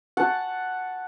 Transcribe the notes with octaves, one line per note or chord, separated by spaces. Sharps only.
F#5 A5